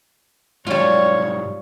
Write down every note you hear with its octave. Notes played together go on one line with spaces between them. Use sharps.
G#2 F#3 G3 F4 C#5